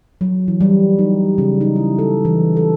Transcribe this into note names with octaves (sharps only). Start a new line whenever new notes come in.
F#3
E3
G3
D#4
C#3
D#4
E4
A4
E3
A4